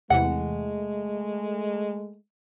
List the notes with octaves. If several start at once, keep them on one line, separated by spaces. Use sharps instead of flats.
E2 C3 E3 G#3 A3 F#5